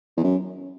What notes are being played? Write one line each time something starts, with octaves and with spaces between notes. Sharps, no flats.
E2
F#2